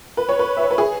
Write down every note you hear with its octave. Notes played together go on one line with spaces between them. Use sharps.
B4
C#5
B4
E5
C#5
B4
G#4